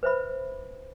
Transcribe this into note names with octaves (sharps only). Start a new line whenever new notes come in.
B4 C5 E5 B5